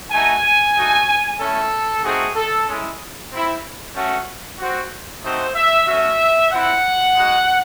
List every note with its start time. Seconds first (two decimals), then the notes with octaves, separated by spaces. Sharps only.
0.11 A3 D#4 F#4 G#5
0.75 A3 D#4 F#4
1.39 A3 C#4 E4 A4
2.03 A3 C4 D#4 F#4 G#4
2.35 A4
2.67 G#3 C#4 E4
3.30 C4 E4
3.95 A3 C#4 F#4
4.59 C4 F#4
5.23 A3 C4 D#4 F#4 C5
5.54 E5
5.86 A3 C#4 F#4 E5
6.51 C4 E4 F#5
7.15 G#3 D#4 F#4